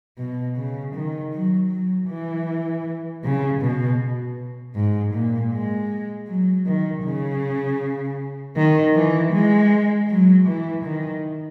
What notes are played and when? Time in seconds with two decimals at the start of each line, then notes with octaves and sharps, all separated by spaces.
0.18 B2
0.57 C#3
0.94 D#3
1.33 F#3
1.71 F#3
2.09 E3
3.24 C#3
3.62 B2
4.75 G#2
5.13 A#2
5.52 G#3
6.27 F#3
6.66 D#3
7.04 C#3
8.56 D#3
8.95 E3
9.32 G#3
10.09 F#3
10.47 E3
10.84 D#3